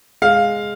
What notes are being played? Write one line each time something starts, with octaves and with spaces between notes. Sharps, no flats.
G#3 F5